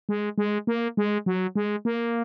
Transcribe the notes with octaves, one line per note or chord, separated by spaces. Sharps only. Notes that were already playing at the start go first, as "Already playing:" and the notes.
G#3
G#3
A#3
G#3
F#3
G#3
A#3